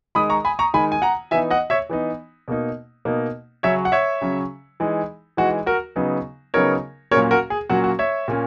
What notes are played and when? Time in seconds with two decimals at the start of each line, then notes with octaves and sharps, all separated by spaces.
0.15 D#3 G#3 D#4 B5 D#6
0.30 A#5 C#6
0.45 G#5 B5
0.59 A#5 C#6
0.74 D#3 G#3 D#4 G#5 B5
0.92 G#5
1.02 F#5 A#5
1.31 E3 B3 D#4 E5 G#5
1.51 D#5 F#5
1.70 C#5 E5
1.90 E3 B3 D#4
2.48 B2 A#3 D#4
3.05 B2 A#3 D#4
3.63 C#3 F#3 C#4 C#5 E5
3.85 F#5
3.92 C#5 E5
4.21 C#3 F#3 C#4
4.80 E3 G#3 D#4
5.37 E3 G#3 D#4 F#4
5.66 F#4 A#4
5.96 C#3 F#3 B3 D#4
6.54 C#3 F#3 B3 D#4 A#4 C#5
7.11 A#2 F#3 A#3 C#4 A#4 C#5
7.31 F#4 A#4
7.50 G#4
7.70 A#2 F#3 A#3 C#4 F#4
7.84 F#4
7.99 C#5 E5
8.28 A#2 A#3 C#4